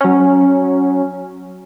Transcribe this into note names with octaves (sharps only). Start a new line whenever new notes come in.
F#3 C#4